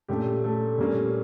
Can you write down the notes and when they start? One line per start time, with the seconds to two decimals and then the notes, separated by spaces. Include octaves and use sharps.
0.08 A#2 A3 C#4 G4
0.44 A3 A4
0.78 A#2 G3 A#3 C#4